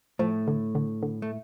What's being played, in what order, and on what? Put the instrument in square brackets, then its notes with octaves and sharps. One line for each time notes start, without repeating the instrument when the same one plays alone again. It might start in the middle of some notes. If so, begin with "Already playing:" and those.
[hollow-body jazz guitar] A2 A3 [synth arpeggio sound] F3
[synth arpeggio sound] D3
D3
D3
[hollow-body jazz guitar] A3